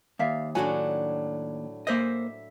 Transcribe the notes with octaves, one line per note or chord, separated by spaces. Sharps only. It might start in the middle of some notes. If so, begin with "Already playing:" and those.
D#2 D5 E5 F5
A2 F#3 D4 F#4 C#5 G#5
A#3 C5 D#5 E5